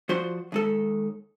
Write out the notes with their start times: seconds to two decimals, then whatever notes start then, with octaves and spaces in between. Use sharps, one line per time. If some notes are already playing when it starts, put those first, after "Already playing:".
0.09 F3 F#4 C5 D5 C6
0.52 D#2 G#3 A4